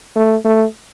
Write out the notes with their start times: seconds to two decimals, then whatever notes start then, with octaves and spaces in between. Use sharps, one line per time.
0.16 A3
0.45 A3